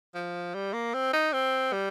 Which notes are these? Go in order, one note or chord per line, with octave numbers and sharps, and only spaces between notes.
F3
G3
A#3
C4
D#4
C4
G3